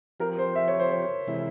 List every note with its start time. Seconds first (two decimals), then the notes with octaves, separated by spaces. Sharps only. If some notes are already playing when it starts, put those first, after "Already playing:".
0.20 F3 C4 G4 A#4
0.38 C5
0.55 E5
0.68 C#5
0.79 C5
0.91 C#5
1.27 C3 E3 G#3 E4